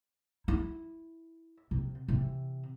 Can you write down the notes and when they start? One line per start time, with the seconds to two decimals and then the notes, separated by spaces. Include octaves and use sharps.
0.48 E4
1.71 C3
2.08 C3 E3